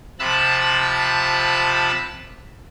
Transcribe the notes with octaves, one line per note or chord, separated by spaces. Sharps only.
C3 F3 A5 B5 E6 F#6